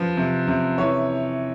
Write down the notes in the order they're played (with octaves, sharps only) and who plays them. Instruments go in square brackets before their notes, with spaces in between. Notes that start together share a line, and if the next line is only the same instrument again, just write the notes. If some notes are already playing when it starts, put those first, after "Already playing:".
Already playing: [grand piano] F3 B4
C3
C3
E3 C#5